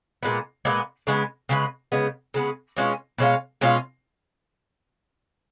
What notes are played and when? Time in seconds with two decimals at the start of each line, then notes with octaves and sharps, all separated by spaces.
0.23 A#2 G#3 B3
0.65 A#2 G#3 B3
1.07 C#3 G#3 B3
1.49 C#3 G#3 B3
1.92 C#3 G#3 B3
2.34 C#3 G#3 B3
2.77 B2 G#3 C#4 F4
3.18 B2 G#3 C#4 F4
3.61 B2 G#3 C#4 F4